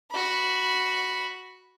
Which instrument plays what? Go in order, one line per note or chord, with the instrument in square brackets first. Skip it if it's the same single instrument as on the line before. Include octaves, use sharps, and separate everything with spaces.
[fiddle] F#4 B5